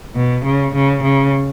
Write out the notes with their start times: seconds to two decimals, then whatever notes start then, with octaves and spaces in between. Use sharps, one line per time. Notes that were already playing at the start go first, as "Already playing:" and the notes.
0.16 B2
0.45 C#3
0.75 C#3
1.03 C#3